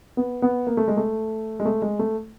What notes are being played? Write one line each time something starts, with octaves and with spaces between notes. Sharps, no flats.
B3
B3
A#3
A3
G#3
A3
G#3
A3
G#3
A3